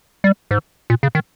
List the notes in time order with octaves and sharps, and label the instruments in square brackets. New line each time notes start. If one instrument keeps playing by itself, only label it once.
[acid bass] G3
G#2
A#2
C#3
D#3